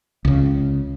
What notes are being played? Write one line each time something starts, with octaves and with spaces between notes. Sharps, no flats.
C#2 C#3